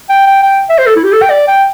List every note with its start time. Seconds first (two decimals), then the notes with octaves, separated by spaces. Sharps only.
0.09 G5
0.27 G5
0.43 G5
0.69 E5
0.78 C5
0.86 A4
0.96 E4
1.04 G4
1.12 A4
1.22 G5
1.30 D5
1.48 G5